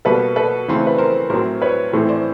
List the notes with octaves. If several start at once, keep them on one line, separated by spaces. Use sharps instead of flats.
B2 G3 A#3 A4 B4
A4 B4
C#3 E3 A3 C4
B4
A#4 C5
A2 F#3 A3 C4 A#4 C5
B4 C#5
A2 E3 A3 C4
C5 D5